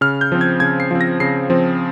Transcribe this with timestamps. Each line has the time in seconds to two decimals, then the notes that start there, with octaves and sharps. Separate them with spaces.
0.01 C#3 F6
0.21 G6
0.32 F3 C4
0.41 G#6
0.60 C#3 G#6
0.80 C7
0.91 F3 C4
1.01 A#6
1.20 C#3 C7
1.50 F3 C4